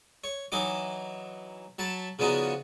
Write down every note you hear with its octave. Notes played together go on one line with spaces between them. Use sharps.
C#5
E3 F#3 D#4 D6
F#3 A5 B5
C#3 F3 B3 D4 D#4 F#4